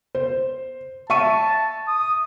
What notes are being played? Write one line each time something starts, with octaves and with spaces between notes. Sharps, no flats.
C5
E5 A5 C#6 D#7
D#6